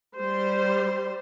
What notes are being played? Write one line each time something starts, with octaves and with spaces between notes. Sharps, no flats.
G3 C5